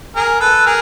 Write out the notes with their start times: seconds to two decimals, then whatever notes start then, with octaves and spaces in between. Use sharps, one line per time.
0.16 G#4 A#4
0.40 A4 B4
0.66 G#4 A#4